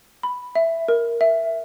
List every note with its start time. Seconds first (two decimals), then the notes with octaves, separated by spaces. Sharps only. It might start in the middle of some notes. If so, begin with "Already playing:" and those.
0.23 B5
0.55 E5
0.88 A#4
1.21 E5